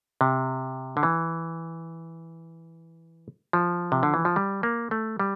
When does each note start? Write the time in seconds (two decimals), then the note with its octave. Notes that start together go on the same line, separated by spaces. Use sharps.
0.21 C3
0.97 D3
1.03 E3
3.53 F3
3.92 C3
4.03 D3
4.14 E3
4.25 F3
4.36 G3
4.63 A#3
4.91 A3
5.20 G3